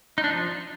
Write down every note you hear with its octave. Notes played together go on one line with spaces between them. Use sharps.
D#4
D4
F3